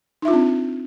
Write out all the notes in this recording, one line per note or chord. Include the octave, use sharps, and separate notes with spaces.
C4 D4 D#4 F4 E5